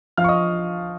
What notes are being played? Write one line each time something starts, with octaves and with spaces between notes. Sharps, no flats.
F3 F5 F6
C#6
D#5 D#6